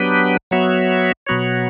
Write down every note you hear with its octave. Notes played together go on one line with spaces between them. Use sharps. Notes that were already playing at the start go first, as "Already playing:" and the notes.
Already playing: F#3 B3 D4 G4 B4
F#3 B3 F#4 C#5 E5
B2 F#3 B3 F#4 C#5